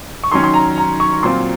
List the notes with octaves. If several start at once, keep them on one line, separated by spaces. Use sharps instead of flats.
C#6
D#3 F#3 C#4 C6
C6
A#5
A#5
C#6
A#2 F#3 C4 F4 C6